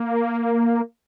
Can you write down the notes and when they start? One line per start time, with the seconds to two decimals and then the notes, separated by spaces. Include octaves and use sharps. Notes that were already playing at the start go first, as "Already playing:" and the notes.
Already playing: A#3